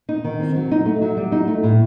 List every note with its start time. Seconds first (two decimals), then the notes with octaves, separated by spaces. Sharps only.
0.09 D#4
0.24 D#3
0.40 C4
0.56 F#3
0.71 D#4
0.86 A3
1.02 F#3
1.17 G3
1.32 D#4
1.47 A3
1.63 A2